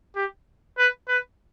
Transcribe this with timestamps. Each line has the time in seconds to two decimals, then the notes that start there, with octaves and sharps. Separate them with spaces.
0.16 G4
0.78 B4
1.08 B4